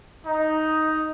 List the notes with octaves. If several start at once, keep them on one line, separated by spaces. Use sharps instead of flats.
D#4